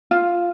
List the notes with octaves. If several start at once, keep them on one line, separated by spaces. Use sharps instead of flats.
F4